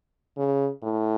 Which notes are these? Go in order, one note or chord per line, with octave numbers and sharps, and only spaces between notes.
C#3
A2